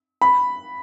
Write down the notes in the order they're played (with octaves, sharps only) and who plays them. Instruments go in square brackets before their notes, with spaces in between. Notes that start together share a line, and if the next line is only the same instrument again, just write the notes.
[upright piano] B5